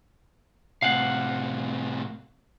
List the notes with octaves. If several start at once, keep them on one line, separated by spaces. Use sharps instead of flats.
A2 C3 F5 F#5